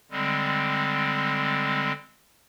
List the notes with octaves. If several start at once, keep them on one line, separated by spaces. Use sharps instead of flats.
D3 G3 G#3 C4